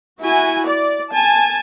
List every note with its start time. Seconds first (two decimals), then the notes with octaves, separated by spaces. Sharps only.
0.21 E4 F#4 G#5
0.65 D5
1.11 G#5 A5